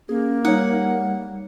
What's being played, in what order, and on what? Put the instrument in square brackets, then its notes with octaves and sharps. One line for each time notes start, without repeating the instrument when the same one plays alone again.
[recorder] A#3 [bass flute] C#4 [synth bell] G#4
[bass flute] G3 [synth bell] D#4 C#5 [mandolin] F#5